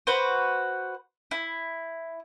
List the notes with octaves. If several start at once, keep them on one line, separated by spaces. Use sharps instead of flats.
F#4 B4 C5
E4